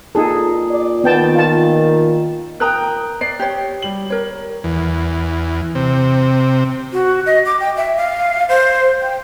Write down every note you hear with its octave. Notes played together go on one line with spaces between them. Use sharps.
A#2 D#4 G#4 A4
D5
D#3 B3 G5 A5
F4 A5
A#4 G5 A#5 D#6 F#6
D5 C7
G4 C#5
G3 F#7
A#4 C#5
E2
C3
F#4
D#5
D6
G5
E5
F5
C5
G5